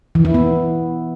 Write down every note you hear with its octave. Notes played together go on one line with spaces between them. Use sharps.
E3
E4
B3